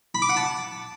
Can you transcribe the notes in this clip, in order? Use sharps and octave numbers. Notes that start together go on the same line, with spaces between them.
B5
D6
F#5
A5